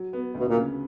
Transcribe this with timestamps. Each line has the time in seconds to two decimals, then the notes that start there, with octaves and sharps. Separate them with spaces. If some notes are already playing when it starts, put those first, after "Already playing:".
Already playing: F#3
0.13 B3
0.34 D2
0.40 B2
0.49 A#2
0.56 C#3